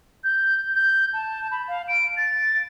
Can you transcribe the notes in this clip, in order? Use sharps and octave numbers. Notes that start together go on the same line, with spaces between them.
G6
G6
A5
B5
F5
D7
A6